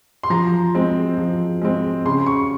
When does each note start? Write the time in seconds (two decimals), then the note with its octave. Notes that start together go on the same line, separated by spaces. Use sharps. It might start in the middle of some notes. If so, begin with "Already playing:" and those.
0.23 C6
0.30 F3 A#5
0.75 G#3 C4
1.17 F3
1.62 G#3 C4
2.05 C#3 C6
2.26 C#6